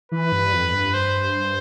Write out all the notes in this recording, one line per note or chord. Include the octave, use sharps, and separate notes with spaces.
E3 B4
G2
F2
G2
C5